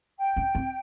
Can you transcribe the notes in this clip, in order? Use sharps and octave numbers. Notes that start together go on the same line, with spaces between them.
G5
C#4
C4